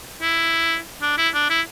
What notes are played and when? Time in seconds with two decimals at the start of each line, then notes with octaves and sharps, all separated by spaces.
0.22 E4
1.02 D4
1.18 E4
1.34 D4
1.50 E4